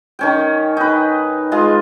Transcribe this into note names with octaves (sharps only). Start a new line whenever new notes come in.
D#3 C#4 G5
D#4 B4
G#3 F4 D#5